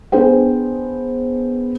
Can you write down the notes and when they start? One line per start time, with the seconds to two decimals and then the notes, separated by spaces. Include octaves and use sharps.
0.12 B3 D4 G#4 C5 G5